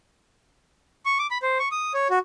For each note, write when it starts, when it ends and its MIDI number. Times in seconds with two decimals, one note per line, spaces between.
1.06 1.18 85
1.19 1.27 86
1.31 1.38 83
1.42 1.58 72
1.59 1.69 85
1.71 1.93 87
1.94 2.08 73
2.10 2.19 66